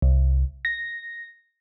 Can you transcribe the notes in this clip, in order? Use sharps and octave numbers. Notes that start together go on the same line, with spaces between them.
C2
A#6